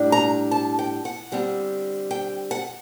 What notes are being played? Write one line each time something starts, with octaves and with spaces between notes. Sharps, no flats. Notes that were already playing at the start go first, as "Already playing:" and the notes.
Already playing: A2 G3 D4
A#5
A5
G5
F#5
D3 G3 C4
G5
F#5